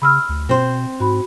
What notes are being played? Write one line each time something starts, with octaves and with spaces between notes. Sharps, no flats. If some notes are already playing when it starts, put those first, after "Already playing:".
C#3 B5 E6 F6
D2
B2 C4 C5
G#2 F#4 B5